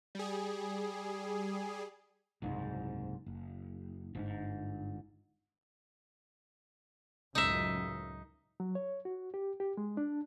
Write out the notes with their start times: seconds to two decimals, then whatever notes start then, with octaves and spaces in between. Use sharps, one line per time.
0.15 G3 G#4
2.42 F#1 C2 G#2
3.26 F#1
4.15 G1 G#2
7.35 C#2 F#2 A2 D#4 E5
8.60 F#3
8.75 C#5
9.05 F#4
9.34 G4
9.60 G4
9.77 G#3
9.97 D4